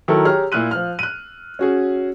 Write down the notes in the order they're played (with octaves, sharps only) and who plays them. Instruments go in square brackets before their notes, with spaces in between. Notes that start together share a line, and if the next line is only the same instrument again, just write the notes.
[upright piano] D#3 F#3 E4 A4 A#4
G4 G#4 C#5 A#5 F6
A#2 E4 F6 F#6 D#7
F3 F6
F#6 D#7
C#4 F#4 G#4